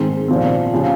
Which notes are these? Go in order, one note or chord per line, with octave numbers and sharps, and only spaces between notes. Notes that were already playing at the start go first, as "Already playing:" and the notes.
Already playing: G#2 D#3 G#3 C4
A#2 F3 C4
C#3 F3